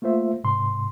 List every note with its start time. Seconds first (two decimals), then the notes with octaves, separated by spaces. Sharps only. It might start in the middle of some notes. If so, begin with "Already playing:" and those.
0.02 A3 A#3 F4 C5 E5
0.44 G#2 C3 C6